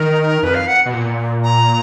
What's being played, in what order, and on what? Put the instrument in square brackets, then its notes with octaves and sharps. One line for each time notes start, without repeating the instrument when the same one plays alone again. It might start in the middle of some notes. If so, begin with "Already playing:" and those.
Already playing: [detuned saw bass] D#3 [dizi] A#4
[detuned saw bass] F2 [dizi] B4
[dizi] F5
F#5
[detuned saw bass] B2
A#2
[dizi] A#5